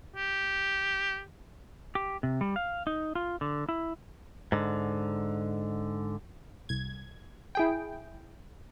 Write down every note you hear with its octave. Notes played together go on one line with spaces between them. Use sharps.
G4
G4
C3
G3
F5
D#4
F4
D3
E4
G#2 D3
C2 G#6
E4 G#4 G5